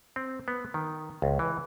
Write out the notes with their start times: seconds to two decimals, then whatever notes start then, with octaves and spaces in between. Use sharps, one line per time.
0.16 C4
0.48 B3
0.74 D#3
1.22 C#2
1.39 E3